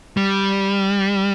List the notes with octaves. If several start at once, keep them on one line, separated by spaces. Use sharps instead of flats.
G3